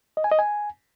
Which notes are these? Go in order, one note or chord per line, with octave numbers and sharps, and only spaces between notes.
D#5
G#5
D#5
G#5